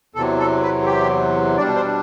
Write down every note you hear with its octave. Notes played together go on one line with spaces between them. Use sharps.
E2 C3 F#3 A4
A4
B4
G4
B2 G3 D4 D5
C5